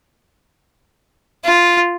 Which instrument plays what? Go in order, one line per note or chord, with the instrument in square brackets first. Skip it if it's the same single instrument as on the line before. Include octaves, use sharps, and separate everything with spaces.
[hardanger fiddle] F4